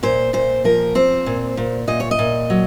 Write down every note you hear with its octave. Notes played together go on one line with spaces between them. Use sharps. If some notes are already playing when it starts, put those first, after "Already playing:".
A#2 C5
A#2 C5
F3 A#4
C4 C5
A#2
A#2
A#2 D#5
C#5
D#5
A#2
F#3